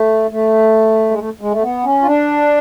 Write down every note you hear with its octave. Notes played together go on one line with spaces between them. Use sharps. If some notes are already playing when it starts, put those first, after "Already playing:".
Already playing: A3
A3
G#3
A3
G#3
A3
B3
C#4
F4
D4